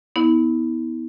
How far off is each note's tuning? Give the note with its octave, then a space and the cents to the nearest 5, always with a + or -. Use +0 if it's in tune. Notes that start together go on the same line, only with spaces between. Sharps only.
B3 +0 E4 -45